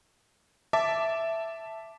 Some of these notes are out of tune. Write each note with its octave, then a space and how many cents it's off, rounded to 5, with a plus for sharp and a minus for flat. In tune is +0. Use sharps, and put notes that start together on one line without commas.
E5 +0 A5 +0 D6 -5